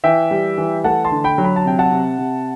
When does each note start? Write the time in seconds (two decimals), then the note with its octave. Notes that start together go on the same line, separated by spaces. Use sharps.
0.04 E3 E5 G5
0.31 G3
0.58 E3
0.84 A3 F#5 A5
1.05 A5 C6
1.11 D3
1.24 G5 B5
1.38 F#3
1.44 B5
1.56 A5
1.65 C3 G5
1.79 F#5 A5
1.91 C3
2.18 C3